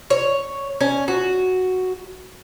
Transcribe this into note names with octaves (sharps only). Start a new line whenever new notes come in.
C#5
C#4
F#4